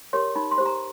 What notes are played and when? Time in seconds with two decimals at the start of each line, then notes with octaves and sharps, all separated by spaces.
0.13 G4 A#4 C#5 C6
0.36 D#4 B5
0.51 C6
0.58 G4 C5
0.66 A#5